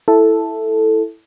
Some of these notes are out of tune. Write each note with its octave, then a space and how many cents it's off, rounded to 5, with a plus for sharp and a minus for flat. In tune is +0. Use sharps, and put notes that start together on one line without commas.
E4 +0 A4 +0